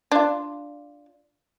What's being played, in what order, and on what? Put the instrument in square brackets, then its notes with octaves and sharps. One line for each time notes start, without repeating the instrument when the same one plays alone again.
[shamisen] D4 F4